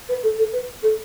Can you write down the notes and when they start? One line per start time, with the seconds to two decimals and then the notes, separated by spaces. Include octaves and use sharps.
0.09 B4
0.23 A4
0.38 A4
0.53 B4
0.83 A4